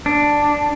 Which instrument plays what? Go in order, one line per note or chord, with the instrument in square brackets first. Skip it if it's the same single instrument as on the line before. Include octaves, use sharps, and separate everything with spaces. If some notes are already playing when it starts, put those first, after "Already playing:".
[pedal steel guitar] D4